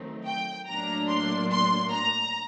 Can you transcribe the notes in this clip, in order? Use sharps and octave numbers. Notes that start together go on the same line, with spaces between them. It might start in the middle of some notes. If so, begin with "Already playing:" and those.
Already playing: D#3 F#3 A3 C4 D#4
G5
A2 F#3 A#3 D4 A#5
C6
C6
A#5